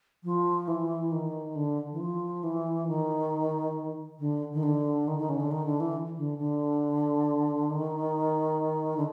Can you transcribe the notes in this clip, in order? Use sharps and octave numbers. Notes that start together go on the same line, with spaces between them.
F3
E3
D#3
D3
E3
F3
E3
D#3
D3
D#3
D3
D#3
D#3
C#3
D3
D#3
D3
E3
D3
D3
D#3
D3